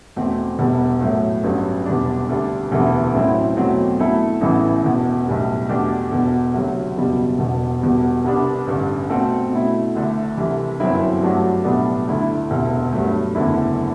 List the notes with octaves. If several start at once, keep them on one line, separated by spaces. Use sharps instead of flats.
E2 B2 A3 C4
E1 E2 C3 G3
A2 F#3 A3
A1 G2 F#3
E1 E2 C3 G3 D4
D2 C3 G3 D4
E1 D2 C3 E3 B3
A1 A2 F#3 C4 E4
E2 B2 F#3 A3 C4
B2 A3 E4 A4
A1 A2 E3 B3 E4
E1 E2 B2
B1 A2 G3
E2 B2 A3 D4 G4
E1 E2 B2
D2 C3 F#3
F#1 E2 B2 G3
E1 E2 B2
E1 E2 B2 G3
C2 C3 G3 B3 D4
A1 G2 D3
B2 A3 C4 F#4 A4
B2 A3 E4
D2 D3 A3
C2 C3 E3
G1 F#2 F#3 C4 E4
G2 F#3 A3 D4 F#4
B1 A2 G3 B3 D4
D2 D3 A3 E4
E1 D2 C3
G2 F#3 A3
F#1 E2 D3 A3 E4